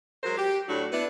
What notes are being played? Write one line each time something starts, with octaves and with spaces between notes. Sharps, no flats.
F#3 G#3 A#4 C5
G4
A2 F#3 D4 F#4
B3 D4 E4